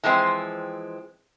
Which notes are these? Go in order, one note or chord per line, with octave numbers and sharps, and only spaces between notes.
E3 F3 G#3 C4